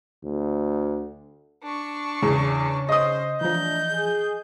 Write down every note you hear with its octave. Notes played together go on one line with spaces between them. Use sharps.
D2
D4 C#6
E2 C#3 C#4
C5 D#5 D#6
A2 E3 F3 D4 A#5 G6
G#4